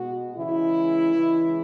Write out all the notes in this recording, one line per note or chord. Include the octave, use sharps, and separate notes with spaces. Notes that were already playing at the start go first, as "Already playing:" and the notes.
Already playing: B2 G#3 F#4
C#3 E3 G#3 E4
C#3 E3 G#3